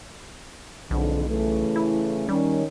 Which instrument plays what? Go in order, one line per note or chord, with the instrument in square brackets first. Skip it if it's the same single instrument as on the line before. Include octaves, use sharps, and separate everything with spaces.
[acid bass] B1 [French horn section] F2 G#2 D3
[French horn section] C#3 E3 A3
[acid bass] E4
[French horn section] D#3 C#4 [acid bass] G3